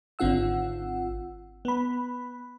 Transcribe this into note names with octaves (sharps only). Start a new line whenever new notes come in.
G#1 D3 C4 F4 F#5 E6
B3 B5